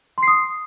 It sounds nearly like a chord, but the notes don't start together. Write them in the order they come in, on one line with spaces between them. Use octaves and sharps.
C6 C7 D#6